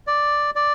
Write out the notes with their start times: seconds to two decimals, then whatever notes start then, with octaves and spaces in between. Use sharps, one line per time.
0.07 D5
0.55 D5